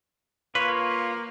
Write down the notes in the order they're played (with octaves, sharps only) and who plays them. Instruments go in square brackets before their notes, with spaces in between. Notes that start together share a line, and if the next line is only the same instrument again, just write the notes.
[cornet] A#3 [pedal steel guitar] F4 C#5 [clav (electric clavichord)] B4